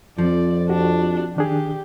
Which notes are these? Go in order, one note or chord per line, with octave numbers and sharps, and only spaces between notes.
F2 F3 D5
D4 F#4 G4
D#3 D4 G4 G#4